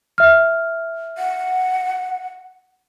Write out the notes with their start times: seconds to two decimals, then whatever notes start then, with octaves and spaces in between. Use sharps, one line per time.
0.18 E5 F6
1.18 F#5